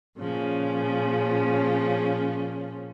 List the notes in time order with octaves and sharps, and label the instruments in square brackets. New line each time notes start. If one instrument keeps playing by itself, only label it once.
[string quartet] A#2 C#3 F3 C#4